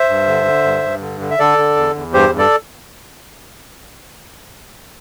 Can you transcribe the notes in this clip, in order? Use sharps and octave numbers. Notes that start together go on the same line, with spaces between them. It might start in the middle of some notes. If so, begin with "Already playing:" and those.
Already playing: C5 E5
G2
D3
D3
G2
G2
D3
D3
E5
D3 A4 D5
D3
E2
E2
G2 G4 C5
G2
A4 D5